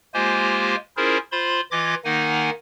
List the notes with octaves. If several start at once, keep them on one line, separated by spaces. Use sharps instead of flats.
G#3 A#3 F4 G4 C5 G#5
C#4 E4 F4 G#4 A#4 C5
F4 C5 B5 C6
E3 F4 D#5 D6 G#6
D#3 A#3 D#4 F#5 G#5